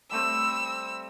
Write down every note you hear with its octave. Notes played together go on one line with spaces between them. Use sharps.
G3 A3 C4 E6